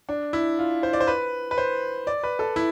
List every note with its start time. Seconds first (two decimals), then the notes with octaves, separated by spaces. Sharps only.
0.09 D4
0.33 E4
0.59 F4
0.83 C5
0.93 D5
1.01 C5
1.07 B4
1.51 B4
1.58 C5
2.07 D5
2.23 B4
2.39 A4
2.56 E4